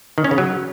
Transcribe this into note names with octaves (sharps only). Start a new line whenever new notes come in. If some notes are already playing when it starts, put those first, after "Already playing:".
D#3
C#4
C#3
F#3